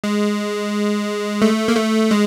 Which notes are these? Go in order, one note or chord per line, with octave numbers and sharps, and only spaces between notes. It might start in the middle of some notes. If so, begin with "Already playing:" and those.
G#3
A3
A#3
A3
G#3